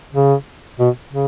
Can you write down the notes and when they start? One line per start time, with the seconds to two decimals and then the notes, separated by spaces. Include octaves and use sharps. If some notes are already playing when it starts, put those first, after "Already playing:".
0.14 C#3
0.79 B2
1.12 C#3